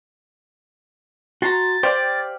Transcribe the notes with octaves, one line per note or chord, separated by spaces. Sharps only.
F#4 A#5 C6 A6
G4 C5 D5 F5